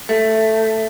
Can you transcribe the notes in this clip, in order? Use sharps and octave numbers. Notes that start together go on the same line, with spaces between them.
A3